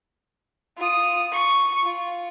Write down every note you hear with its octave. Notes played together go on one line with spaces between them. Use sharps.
F4 D#6
C#6
F4